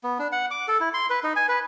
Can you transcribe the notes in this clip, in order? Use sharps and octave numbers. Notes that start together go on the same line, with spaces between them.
B3
D4
F#5
D6
A4
E4
C6
B4
D#4
G#5
B4